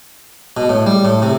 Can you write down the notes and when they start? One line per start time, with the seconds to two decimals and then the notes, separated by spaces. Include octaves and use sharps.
0.57 B2
0.69 A2
0.87 G3
1.05 A2
1.22 C3